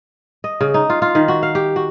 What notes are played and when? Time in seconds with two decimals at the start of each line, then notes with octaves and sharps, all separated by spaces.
0.44 D#5
0.61 C#3
0.74 D#4
0.90 F4
1.02 F4
1.15 D#3
1.28 F#4
1.43 F5
1.55 G4
1.76 F#4